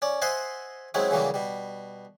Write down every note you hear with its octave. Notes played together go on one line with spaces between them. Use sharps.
C#4 D5
C5 D#5 E5 F#5 G#5 C6
F#3 G#3 C4 C#4 E4
C#3 E3 F#3 G3 A#3
B2 G3